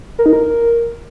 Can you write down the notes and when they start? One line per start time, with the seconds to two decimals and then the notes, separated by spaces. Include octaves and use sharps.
0.19 A#4
0.26 D#4
0.33 A#4